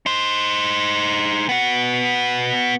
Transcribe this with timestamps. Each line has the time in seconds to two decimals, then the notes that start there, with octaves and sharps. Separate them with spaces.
0.06 D#4 C5
1.49 B3 F#4